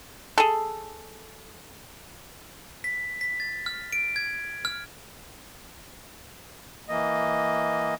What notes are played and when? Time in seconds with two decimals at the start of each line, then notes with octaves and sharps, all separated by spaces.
0.38 G#4 A4
2.84 B6
3.21 B6
3.40 A6
3.66 F6
3.93 D7
4.16 G#6
4.65 F6
6.89 E3 A#3 D#5